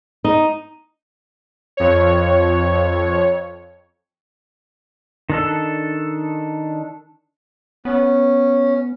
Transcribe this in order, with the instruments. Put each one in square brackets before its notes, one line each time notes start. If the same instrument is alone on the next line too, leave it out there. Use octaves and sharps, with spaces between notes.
[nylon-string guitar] D#4
[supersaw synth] F2 C#5
[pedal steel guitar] D#3 D4 A4
[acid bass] B3 [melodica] C#4